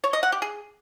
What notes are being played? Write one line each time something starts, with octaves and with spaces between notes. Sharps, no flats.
C#5
D#5
F#5
G4
G#4